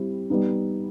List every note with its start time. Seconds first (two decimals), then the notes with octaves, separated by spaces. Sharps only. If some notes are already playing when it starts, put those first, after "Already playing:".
Already playing: G3 C4 E4 G4
0.30 G3 B3 D#4